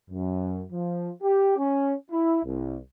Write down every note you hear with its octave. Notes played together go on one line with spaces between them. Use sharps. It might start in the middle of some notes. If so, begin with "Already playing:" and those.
F#2
F3
G4
C#4
E4
C2